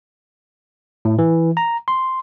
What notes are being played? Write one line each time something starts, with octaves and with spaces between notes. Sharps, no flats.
A2
E3
A#5
C6